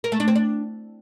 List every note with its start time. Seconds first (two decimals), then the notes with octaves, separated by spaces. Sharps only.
0.04 A#4
0.12 A3
0.20 D4
0.28 C4
0.36 D4